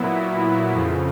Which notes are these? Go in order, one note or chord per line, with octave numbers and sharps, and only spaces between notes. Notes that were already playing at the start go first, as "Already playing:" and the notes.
Already playing: A#2 F#3 B3 E4
F2 C#3 F3